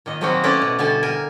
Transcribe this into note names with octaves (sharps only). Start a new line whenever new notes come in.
A#2 D#3 D#5
F#3 G#3 A#3 C4 D#4 F#4
A3 C#4 E4 B4 D5
B2
B2 D3 G3 G#5 A5
A#4 G#5